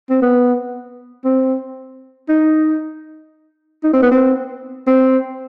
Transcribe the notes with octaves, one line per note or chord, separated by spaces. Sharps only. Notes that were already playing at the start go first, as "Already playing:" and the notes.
C4
B3
C4
D#4
D#4
C4
B3
C4
C4